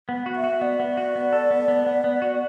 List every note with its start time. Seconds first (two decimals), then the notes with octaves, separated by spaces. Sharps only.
0.09 B3
0.26 F#4
0.36 E5
0.44 F#4
0.61 B3 D5
0.80 B3
0.97 F#4
1.16 B3
1.33 A4
1.51 B3
1.68 B3
1.86 B3
2.04 B3
2.22 F#4